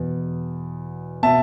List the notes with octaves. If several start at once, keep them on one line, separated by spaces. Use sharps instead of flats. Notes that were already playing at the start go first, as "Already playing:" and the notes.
Already playing: E2 B2 B3
B2 B3 E5 A5